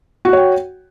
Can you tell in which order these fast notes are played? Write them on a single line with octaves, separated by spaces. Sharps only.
F#4 F#5 C#5 G5